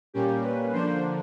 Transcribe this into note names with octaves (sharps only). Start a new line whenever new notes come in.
A#2 G3 A#3 C#4 G4
B4
D3 F3 A#3 D4 C5